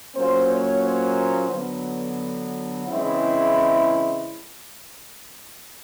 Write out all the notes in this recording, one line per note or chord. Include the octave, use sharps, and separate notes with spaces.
A#2 F#3 A#3 C#4 C5
C#5
C5
D3 F#3 B3
C#3 E3 G#3 C4 E4